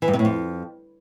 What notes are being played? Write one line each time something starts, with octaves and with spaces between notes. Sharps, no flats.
E3
G2
C3
A2
F2